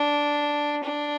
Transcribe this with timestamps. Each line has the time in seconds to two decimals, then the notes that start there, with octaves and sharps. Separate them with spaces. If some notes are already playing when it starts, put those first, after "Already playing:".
Already playing: D4
0.83 D4